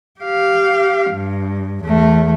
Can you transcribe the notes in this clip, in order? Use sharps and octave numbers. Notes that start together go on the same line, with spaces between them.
G4 F5
G2
E2 A3